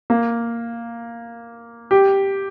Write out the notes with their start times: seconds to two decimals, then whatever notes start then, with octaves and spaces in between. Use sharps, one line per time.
0.10 A#3
1.91 G4